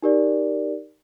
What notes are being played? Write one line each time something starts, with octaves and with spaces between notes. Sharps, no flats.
D#4 G4 A#4 D5